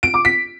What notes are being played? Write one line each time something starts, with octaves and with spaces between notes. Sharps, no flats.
D7
D6
B6